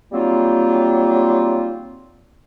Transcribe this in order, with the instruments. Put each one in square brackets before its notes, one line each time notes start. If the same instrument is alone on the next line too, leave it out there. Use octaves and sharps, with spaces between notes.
[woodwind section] F#3 G3 A#3 C4 D#4 F4